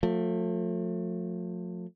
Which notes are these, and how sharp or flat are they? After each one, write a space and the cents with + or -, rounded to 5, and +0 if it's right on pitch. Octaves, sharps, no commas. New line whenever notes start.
F3 +40 A3 +25